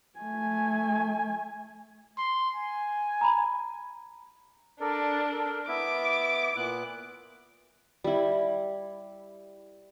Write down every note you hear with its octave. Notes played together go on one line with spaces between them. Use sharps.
A3 G#5
C6
G#5
A#5 B5
D4 A4 A#4 D5
A4 A#4
B3 E4 E5 D6
A#2 B3 F#6
G3 E4